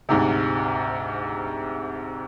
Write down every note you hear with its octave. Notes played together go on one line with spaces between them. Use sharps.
D2 G#2 C3